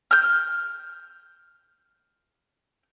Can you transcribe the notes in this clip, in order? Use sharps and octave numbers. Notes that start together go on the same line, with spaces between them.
F6 G6